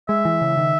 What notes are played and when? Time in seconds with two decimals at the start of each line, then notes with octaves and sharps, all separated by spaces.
0.09 G#3 E5
0.25 E3
0.41 C#3
0.57 D#3